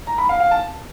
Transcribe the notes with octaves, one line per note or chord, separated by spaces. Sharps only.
A#5
B5
F5
F5
A5